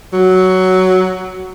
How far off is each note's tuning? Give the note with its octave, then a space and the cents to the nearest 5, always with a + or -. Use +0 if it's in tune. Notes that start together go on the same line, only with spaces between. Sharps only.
F#3 +10